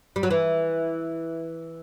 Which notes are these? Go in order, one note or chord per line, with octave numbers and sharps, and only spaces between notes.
G3
F#3
E3